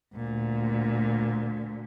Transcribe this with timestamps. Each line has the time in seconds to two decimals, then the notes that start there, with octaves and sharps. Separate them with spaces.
0.15 D2 A#2